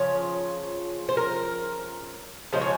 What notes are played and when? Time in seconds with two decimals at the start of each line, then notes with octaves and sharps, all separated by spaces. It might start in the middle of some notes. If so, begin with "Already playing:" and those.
Already playing: C#3 F3 C#5
1.09 C5
1.17 A#4
2.53 C#3 F3 G#3 C5
2.61 C#5